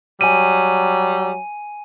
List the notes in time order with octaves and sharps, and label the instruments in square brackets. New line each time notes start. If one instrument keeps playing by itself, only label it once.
[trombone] F#3 [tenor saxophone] G3 [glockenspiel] G#5 D#7